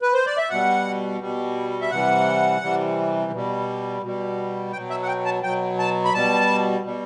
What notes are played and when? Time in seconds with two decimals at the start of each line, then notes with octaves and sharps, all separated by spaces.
0.02 B4
0.13 C5
0.26 D5
0.37 E5
0.50 B2 G3 F#5
1.21 B2 G3
1.81 E5
1.90 C3 E3 G3 F#5
2.61 C3 E3 G3
3.32 B2 G3
4.02 B2 G3
4.72 B2 F#3 G5
4.90 E5
5.02 F#5
5.08 G5
5.25 A5
5.43 B2 F#3 G5
5.79 A5
6.05 B5
6.14 B2 G3 A5
6.84 B2 G3